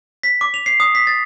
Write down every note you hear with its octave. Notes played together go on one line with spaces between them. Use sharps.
B6
D6
F7
C7
D#6
B6
A6